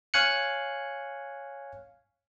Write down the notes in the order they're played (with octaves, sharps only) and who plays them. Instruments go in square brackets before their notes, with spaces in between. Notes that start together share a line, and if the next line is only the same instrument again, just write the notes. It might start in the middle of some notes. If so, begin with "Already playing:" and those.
[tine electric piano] C#5 F5 G#5 F#6 C#7